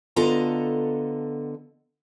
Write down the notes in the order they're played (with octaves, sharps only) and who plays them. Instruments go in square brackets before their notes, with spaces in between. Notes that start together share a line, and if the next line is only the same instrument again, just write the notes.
[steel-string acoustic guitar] D3 B3 F4 A4 D#5 A#5